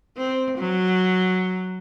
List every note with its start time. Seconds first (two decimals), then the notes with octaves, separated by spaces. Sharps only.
0.17 C4
0.58 F#3